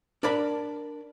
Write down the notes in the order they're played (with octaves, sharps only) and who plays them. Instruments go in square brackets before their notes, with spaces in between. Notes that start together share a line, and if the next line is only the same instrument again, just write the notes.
[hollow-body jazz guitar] D4 A#4 D5 B5